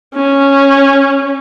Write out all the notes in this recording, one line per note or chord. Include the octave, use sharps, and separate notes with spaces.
C#4